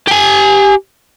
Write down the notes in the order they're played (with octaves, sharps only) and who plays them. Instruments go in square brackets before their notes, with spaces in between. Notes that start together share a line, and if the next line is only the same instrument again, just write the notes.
[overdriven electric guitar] G4 G#5